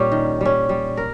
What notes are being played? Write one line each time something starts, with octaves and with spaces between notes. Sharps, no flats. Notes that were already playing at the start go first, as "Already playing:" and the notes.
Already playing: A#2 G3 C#4 G4
D#3
G3 C#4
G3
A#4